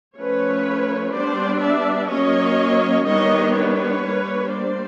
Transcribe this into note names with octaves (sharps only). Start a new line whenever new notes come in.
F3 A3 C#4 B4 C#5
G3 B3 D4 C5 D5
D5 E5
F#3 A#3 C#4 C#5 D#5
D#3 G3 B3 D4 C#5 D#5
B4 C#5
G3 A#3 D4
C5 D5